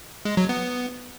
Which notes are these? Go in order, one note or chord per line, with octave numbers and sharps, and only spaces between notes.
G#3
F#3
B3